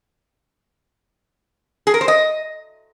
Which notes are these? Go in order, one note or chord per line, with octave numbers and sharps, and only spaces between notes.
G#4
A#4
C5
D#5